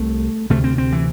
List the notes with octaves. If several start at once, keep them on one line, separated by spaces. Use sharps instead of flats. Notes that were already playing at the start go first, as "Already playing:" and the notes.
Already playing: C2 C3 A3
D2 C3 A3
C4
C4
E3